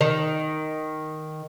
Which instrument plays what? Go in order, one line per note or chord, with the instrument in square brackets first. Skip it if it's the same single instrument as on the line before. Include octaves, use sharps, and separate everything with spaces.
[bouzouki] D#3